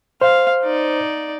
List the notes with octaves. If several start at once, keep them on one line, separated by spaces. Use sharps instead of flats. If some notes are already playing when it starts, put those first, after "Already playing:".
C5 F5
D#4 D5